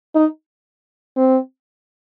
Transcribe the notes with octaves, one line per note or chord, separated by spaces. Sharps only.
D#4
C4